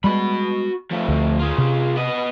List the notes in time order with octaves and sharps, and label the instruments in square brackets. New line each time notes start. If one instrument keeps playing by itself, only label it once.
[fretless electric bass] G3 G#3 [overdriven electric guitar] F#4 B5
[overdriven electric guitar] F3 A3
[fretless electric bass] D2
[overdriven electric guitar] F4 G#4
[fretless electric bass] C3
[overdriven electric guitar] B3 D#5